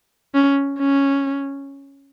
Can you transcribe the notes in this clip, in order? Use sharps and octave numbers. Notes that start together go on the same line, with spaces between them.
C#4
C#4